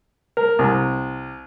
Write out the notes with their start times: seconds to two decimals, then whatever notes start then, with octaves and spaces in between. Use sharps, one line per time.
0.37 A#4
0.59 C2